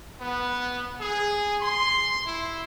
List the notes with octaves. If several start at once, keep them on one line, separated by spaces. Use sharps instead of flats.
B3
G#4
C6
E4